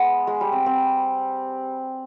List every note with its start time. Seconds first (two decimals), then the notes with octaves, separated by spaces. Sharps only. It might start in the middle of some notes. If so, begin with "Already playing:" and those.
Already playing: G#3 B3
0.27 G#3
0.41 G3
0.52 C4
0.66 C4